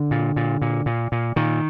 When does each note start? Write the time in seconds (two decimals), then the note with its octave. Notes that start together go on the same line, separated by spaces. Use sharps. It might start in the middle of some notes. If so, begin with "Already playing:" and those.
Already playing: D3
0.11 A#2
0.36 A#2
0.62 A#2
0.86 A#2
1.12 A#2
1.36 A#2 D#3